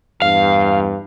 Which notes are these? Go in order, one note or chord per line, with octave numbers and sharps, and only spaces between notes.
E2 G2 F5